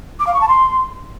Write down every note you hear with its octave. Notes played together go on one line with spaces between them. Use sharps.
D6
F5
C#6
A5
C6